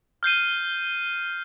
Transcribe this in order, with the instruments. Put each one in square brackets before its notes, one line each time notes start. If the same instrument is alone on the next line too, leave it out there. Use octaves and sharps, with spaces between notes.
[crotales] F6 G6 C7 D#7